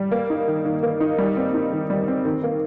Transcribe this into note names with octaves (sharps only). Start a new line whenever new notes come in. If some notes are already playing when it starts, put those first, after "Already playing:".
Already playing: G3
A#3
D#4
D#3
D#3
A#3
D#4
G3
C4
D#4
D#3
G3
C4
D#3
A#3